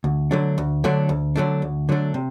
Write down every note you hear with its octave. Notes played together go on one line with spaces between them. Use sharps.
D2
D3 F#3 A3 D4
D2
D3 F#3 A3 D4
D2
D3 F#3 A3 D4
D2
D3 F#3 A3 D4
C3